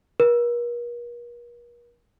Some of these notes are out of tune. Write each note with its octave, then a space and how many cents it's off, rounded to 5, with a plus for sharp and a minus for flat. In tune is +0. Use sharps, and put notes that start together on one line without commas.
A#4 +45